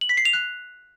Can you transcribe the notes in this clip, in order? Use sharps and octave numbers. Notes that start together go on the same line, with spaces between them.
F#7
B6
C7
F7
F#6